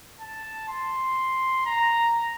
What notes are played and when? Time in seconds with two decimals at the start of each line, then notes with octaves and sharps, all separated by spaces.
0.21 A5
0.69 C6
1.66 A#5